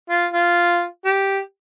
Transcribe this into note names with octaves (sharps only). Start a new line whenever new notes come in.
F4
F4
G4